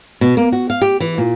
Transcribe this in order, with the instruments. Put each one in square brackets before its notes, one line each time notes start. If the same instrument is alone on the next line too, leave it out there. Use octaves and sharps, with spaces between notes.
[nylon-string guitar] B2
A#3
F#4
F5
G4
E3
A#2